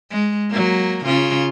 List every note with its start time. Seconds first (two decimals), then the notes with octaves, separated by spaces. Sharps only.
0.11 G#3
0.50 F#3 A#3
1.05 C#3 F4